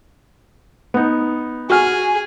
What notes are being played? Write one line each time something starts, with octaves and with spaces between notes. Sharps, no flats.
B3 D#4
F#4 G#4 G#5 F6